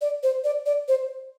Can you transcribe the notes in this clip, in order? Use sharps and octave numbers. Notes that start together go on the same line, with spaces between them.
D5
C5
D5
D5
C5